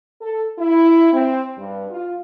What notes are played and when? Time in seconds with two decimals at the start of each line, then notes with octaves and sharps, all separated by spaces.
0.21 A4
0.58 E4
1.13 C4
1.57 G2
1.91 F4